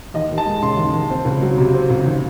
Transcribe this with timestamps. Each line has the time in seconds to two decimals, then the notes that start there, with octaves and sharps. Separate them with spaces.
0.14 D#2 D#5
0.31 D#2
0.38 A5
0.46 G#3
0.62 C#3 C6
0.77 D#2
0.94 D#2
1.10 C4
1.25 C#2
1.42 F#3
1.58 C3
1.74 C4
1.90 C#2
2.05 D#2